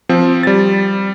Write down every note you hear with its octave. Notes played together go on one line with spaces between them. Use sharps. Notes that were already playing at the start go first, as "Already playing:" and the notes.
F3 C4
G3 A6